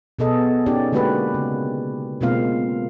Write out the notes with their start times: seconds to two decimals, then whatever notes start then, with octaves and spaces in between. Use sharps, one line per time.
0.19 B2 B3 G#4 A4 D#5
0.66 C#4 D#4 G4 D5
0.92 D3 G#3 A#3 F#4 G4 B4
1.34 C#3
2.21 B2 G#3 A#3 C4 F4 F5